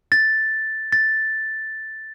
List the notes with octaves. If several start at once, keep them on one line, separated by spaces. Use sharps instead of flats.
A6
A6